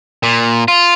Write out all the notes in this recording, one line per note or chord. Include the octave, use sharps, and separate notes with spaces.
A#2
F4